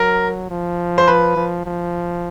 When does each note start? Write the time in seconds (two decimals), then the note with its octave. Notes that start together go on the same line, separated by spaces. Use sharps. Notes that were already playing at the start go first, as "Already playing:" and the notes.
Already playing: F#3 A#4
0.50 F3
0.98 C5
1.08 B4
1.36 F3
1.66 F3